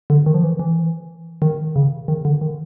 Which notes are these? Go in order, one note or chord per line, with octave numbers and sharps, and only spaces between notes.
D3
D#3
F3
E3
E3
D#3
C#3
D#3
D3
D#3